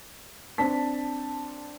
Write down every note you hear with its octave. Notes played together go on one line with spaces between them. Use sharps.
C4 D4 A5 B6